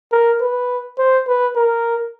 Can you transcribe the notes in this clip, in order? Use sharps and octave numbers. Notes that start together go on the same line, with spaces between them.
A#4
B4
C5
B4
A#4